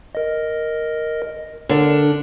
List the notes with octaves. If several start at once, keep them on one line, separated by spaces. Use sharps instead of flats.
A#4 D#5
D3 D4 A#4